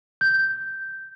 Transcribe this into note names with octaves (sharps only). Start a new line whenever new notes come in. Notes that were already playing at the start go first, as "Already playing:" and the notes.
G6